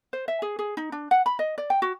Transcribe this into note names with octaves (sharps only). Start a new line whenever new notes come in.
C5
E5
G#4
G#4
D#4
D4
F#5
B5
D#5
D5
G5
F#4